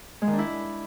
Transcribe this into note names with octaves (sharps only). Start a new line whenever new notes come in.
G#3
D#3
D4
E4